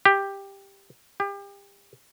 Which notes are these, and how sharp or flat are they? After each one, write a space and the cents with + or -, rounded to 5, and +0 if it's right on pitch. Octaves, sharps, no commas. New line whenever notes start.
G4 +10
G4 +35